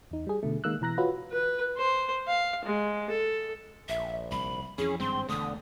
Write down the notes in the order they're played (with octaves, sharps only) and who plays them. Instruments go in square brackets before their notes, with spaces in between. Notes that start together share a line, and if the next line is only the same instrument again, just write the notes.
[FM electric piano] E2 D#4
G3 G#4
B2 D3 A3
D#3 G#3 A#3 E6 F#6
B2 E3 A#5 F#6 A#6
F4 F#4 B4 C#5
[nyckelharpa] B4
C5
F5
G#3
A4
[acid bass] A#1 [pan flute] E5
[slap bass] C2 [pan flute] B5
[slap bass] F2 E3 [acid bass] C#4 [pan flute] G#4
[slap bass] G#1 G2 G#3 [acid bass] C4 [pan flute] C6
[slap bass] E1 A3 [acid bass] D3 [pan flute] D#6